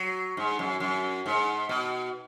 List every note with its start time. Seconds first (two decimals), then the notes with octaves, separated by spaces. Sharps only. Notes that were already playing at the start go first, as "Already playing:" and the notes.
Already playing: F#3
0.37 G#2
0.59 F#2
0.80 F#2
1.26 G#2
1.69 B2